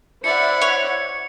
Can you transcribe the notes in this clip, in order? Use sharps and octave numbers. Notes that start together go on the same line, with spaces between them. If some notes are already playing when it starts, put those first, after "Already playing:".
E4 C5 D5 E5 F#5 C#7
C#5